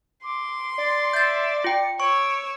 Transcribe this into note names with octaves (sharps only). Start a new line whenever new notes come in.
C6 D6
D5 A6
E5 G6 A6
F4 G5 C#7
C#5 C#6 E6 D7